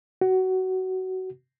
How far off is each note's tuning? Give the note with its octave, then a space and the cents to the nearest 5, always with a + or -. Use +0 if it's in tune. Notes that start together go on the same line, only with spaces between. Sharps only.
F#4 +20